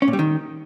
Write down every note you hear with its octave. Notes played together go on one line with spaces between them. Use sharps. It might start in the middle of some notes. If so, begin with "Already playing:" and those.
C#4
A#2
G3
D#3